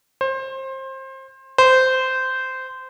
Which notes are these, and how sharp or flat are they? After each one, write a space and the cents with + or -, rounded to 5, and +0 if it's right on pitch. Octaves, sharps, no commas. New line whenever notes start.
C5 +25
C5 -15